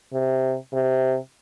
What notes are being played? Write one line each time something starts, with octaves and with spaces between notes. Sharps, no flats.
C3
C3